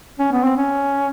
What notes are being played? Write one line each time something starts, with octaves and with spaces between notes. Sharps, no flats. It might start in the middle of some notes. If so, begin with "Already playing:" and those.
C#4
B3
C4
C#4